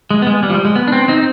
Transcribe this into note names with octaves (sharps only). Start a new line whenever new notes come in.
G#3
B3
G#3
G3
F3
G3
G#3
B3
D4
C4
C4 D#4